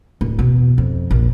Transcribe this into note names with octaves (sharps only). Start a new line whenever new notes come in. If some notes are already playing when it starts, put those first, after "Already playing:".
D1
E2 B2
F2
A#1